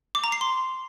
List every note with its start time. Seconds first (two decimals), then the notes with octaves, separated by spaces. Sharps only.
0.15 D6
0.24 A#5
0.32 C7
0.41 C6